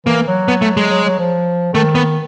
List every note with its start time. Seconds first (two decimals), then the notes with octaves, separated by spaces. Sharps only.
0.06 E3 A#3
0.28 F#3
0.48 B3
0.62 A3
0.77 G#3
0.90 F#3
1.05 F#3
1.19 F3
1.74 D#3 A3
1.95 B3